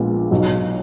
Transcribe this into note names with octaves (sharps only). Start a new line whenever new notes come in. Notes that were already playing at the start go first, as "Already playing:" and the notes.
Already playing: A#1 A#2 G#3 B3
B1 B2 F#3